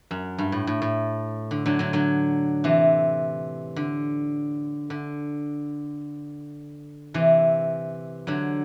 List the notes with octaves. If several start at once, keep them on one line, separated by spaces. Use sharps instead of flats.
F#2
G2
A2
A2
A2
D3
D3 F#3
D3 F#3
D3 F#3
C3 E3
D3
D3
C3 E3
D3 F#3